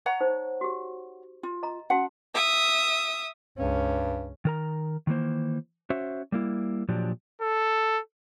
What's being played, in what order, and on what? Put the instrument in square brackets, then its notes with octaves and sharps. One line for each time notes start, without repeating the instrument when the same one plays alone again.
[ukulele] C#5 F#5 A#5
[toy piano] D#4 C5
F#4 G4
[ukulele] F4
[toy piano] D#5 A#5
[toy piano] C#4 F#4 A5 [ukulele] F#5
[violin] E5 D#6
[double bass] C#2 C#4 [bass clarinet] G2
[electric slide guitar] D#3 A#4 A#5
D#3 E3 A#3 C5
C#4 F#4 C5 E5
G3 A#3 E4
A#2 F3 F#3 D4 G4
[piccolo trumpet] A4